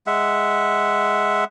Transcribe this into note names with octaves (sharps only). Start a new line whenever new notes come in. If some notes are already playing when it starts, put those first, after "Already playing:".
G#3 E5 F#5